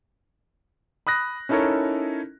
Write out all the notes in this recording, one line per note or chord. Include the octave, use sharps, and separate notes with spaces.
B5 D#6 F#6 A#6
C#4 D#4 E4 A4 A#4 C#5